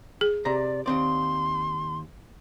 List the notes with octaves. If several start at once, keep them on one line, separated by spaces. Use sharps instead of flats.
G#4
C3 D5 A#5
D#2 C4 D5 C6